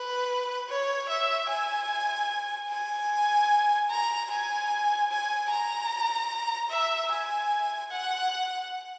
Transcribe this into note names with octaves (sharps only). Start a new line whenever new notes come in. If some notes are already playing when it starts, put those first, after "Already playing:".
Already playing: B4
C#5
E5
G#5
G#5
A#5
G#5
G#5
A#5
E5
G#5
F#5